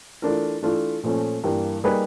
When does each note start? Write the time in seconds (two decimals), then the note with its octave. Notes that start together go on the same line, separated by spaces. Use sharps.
0.22 E3 A3 D4 F4 A#4
0.62 E3 A3 D4 F4
1.03 A#2 F3 A3 C#4
1.44 G2 E3 G3 A#3
1.84 G3 A#3 D#4 G#4 B4